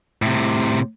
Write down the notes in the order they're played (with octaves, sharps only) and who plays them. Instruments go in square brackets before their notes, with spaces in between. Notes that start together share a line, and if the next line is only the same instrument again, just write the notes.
[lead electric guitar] A2 C3